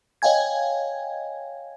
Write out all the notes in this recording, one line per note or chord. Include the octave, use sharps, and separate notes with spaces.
C#5 D#5 F5 G5 G#5 G#6